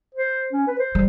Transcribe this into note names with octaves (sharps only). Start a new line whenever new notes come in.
C5
C#4
B4
C5
G3